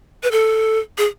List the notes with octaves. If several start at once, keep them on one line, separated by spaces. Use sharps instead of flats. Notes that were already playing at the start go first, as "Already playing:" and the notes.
B4
A4
G#4